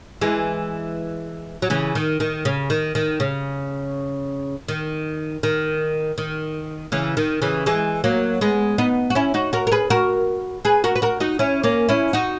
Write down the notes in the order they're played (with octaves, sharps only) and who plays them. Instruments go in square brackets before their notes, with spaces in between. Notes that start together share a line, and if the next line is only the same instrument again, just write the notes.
[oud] E3 G#3
F#3
C#3 E3
D#3
D#3
C#3
D#3
D#3
C#3
D#3
D#3
D#3
C#3 E3
D#3
C#3 E3
E3 G#3
F#3 A#3
G#3 B3
B3 D#4
F#4
C#4 E4
D#4 F#4
F#4 A#4
A#4
G#4 B4
F#4 A#4
G#4 B4
F#4 A#4
B4
F#4 A#4
D#4 F#4
C#4 E4
A#3 C#4
C#4 E4
D#4 F#4